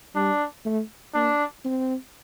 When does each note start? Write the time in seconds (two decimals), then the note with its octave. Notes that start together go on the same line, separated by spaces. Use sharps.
0.15 G3 D4
0.65 A3
1.14 A#3 D4
1.65 C4